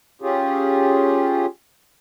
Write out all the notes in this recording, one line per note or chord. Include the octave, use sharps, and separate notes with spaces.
C#4 F4 G4 G#4